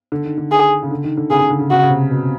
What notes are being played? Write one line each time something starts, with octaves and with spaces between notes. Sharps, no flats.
D3
D#3
D3
G#4
C#3
D3
D#3
D3
C#3 G#4
C#3
D3
C#3
C#3 F#4
C#3
C3
B2